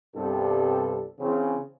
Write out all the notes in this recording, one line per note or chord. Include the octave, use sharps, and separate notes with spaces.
C2 G2 C3 G3 B3 A4
C#3 E3 C4